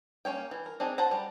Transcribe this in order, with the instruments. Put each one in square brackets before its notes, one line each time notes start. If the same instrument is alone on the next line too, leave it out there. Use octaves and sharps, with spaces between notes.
[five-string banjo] A#3 C#4 C#5 G5
E3
A#4
C4 D4 D#4 G#4
C5 F#5 A5 A#5
G3